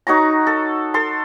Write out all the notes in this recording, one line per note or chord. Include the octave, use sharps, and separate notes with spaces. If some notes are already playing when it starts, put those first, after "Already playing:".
D#4 F#4 C#5 A#5
A4
A4 C6